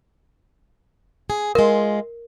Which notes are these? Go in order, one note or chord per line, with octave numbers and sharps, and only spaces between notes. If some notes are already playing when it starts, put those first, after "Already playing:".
G#4
G#3 F4 A#4